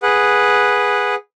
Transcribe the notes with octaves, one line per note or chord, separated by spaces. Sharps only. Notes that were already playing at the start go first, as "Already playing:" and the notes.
G#4 B4 F#5